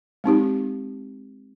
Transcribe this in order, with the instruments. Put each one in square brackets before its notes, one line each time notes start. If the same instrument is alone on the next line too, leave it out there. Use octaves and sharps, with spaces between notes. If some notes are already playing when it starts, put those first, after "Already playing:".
[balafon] G#3 C4 D#4 G4